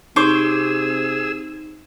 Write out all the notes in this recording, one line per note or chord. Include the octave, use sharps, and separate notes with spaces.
C3 D#4 G#4 C5 C#6 D6 E6